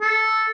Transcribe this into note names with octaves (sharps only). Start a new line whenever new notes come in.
A4